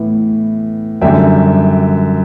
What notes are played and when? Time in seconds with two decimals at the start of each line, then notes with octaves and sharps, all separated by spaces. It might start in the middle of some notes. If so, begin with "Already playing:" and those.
Already playing: A2 E3 B3
1.02 F#2 D3 G3 E5 G5